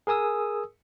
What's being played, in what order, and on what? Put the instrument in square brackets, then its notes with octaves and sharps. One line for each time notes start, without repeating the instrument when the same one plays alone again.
[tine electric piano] G#4 A#4 G#5 D#6 E6